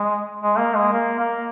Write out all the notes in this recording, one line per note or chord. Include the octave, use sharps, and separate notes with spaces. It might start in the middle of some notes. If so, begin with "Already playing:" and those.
Already playing: G#3
G#3
A#3
G#3
A#3
A#3